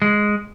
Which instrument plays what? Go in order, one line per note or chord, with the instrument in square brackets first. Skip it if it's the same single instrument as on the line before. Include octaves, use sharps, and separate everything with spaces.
[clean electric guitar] G#3